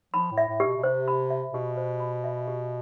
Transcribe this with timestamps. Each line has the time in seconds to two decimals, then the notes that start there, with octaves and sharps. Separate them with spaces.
0.14 F3 B5
0.31 A2
0.38 E5
0.49 A2
0.60 G4
0.66 B2
0.77 B2
0.83 C3 C5
1.08 B5
1.30 E5
1.53 B2 G4
1.77 C5
2.00 B5
2.24 E5
2.47 G4